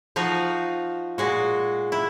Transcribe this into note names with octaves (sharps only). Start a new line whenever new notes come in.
F3 D#4 F4 F#4
A#2 G#3 F#4
E4